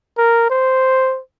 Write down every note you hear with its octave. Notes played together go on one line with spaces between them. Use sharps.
A#4
C5